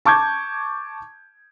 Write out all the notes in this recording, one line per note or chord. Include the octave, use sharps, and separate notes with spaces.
A5 C#6 D6 G6 G#6